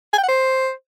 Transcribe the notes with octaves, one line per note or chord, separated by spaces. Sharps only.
G#5
G5
F#5
C5